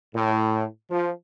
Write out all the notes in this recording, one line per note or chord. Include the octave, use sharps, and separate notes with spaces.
A2
F3